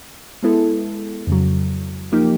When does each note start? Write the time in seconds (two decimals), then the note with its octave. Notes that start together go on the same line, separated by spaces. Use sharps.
0.43 G#3 B3 E4 A4
1.27 F2 C#3 F#3
2.12 F3 A#3 D#4 G4